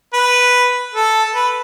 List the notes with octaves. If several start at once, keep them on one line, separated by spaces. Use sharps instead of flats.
B4
A4
B4